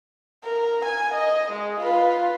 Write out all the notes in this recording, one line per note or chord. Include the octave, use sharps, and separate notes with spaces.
A#4
G#5
D#5
G#3
F4 B4